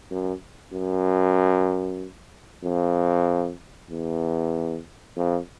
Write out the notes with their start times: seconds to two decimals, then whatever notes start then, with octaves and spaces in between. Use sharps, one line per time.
0.11 F#2
0.73 F#2
2.63 F2
3.90 E2
5.17 F2